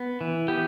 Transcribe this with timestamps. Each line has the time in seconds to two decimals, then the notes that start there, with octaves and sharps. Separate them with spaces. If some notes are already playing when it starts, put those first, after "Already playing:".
Already playing: B3
0.21 E3
0.48 B3 G4